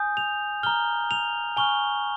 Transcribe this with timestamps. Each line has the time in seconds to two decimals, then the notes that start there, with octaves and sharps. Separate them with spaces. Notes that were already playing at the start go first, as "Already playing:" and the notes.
Already playing: G#5 D#6 G6
0.17 F7
0.63 A#5 F6 G7
1.11 F7
1.57 G#5 C#6 F6 G7